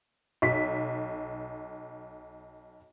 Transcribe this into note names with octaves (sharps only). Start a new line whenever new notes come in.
B1 B6